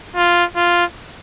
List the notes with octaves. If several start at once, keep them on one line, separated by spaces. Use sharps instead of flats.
F4
F4